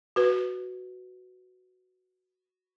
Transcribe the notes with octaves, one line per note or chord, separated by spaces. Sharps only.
F#4 B4